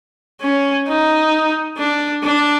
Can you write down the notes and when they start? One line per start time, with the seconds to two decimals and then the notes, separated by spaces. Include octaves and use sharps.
0.41 C#4
0.87 D#4
1.78 D4
2.23 D4